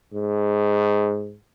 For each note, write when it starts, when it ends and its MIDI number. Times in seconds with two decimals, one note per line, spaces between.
0.14 1.36 44